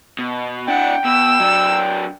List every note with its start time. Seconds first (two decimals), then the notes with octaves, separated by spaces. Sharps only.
0.19 B2
0.68 D4 E4 F#5 G5
1.05 B2 E6
1.40 F#3 D4